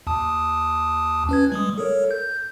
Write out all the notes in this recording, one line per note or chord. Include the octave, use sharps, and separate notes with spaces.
D#2 A5 D#6
C#4 B4 G#6
G3 G#3 D#6
A4 A#4 C#5
G6